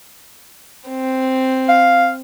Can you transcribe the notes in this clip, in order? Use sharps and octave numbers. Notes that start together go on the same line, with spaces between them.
C4
F5